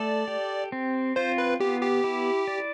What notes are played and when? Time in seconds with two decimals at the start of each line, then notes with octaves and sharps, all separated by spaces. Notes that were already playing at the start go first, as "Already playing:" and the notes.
Already playing: A3 A4 D5
0.28 G4
0.72 C4
1.16 F4 C5
1.38 B4
1.60 B3 G4
1.82 G4
2.04 E4
2.47 D5